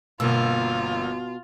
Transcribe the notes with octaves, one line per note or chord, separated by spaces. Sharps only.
G1 B2 A#3 F4 E6